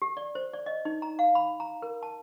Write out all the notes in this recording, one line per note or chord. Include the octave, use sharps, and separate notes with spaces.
G4
D5
C5
D5
D#5
D#4
A#5
F5
B5
A#5
A#4
A5